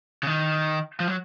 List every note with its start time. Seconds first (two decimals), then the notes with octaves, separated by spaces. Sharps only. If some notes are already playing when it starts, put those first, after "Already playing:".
0.23 C#3
0.27 D#3
1.00 F3
1.07 F#3